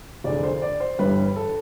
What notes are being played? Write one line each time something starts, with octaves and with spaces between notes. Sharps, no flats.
F1 E2 D3 D5
C5
D5
C5
G1 G2 E3 G3 B4
A4